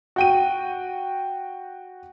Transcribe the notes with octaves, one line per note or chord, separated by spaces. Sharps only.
F#4 G5 D#7